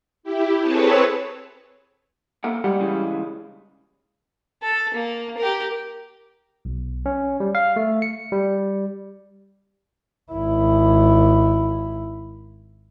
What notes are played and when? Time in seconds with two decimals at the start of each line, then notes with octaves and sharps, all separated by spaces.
0.23 E4 G4
0.60 C4 G#4 A4 B4 C#5 A5
2.44 A#3 A4 F#5
2.64 F#2 G3 G#3 F#5
2.80 C#3 E3 G#3
4.62 A4
4.94 A#3
5.38 G4 A#4
6.65 B1
7.06 C#4
7.40 G3
7.55 F5
7.76 A3
8.02 C#7
8.32 G3
10.32 G#1 E4